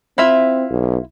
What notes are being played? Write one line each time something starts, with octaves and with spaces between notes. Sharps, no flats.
C4 E4 F4 E5
B1